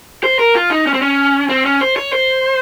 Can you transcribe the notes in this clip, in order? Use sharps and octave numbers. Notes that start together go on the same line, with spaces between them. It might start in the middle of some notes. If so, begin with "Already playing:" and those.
C5
A#4
F4
D#4
C#4
C4
C#4
C4
C#4
C5
C#5
C5